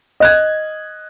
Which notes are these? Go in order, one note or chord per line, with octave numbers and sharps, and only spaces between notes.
D#5 F#6 G#6